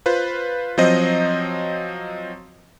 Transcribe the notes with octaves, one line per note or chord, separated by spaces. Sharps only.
F4 B4 C5
F3 F#3 C4 C5 D#5